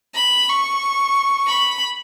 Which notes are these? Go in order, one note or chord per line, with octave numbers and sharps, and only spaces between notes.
B5
C#6
B5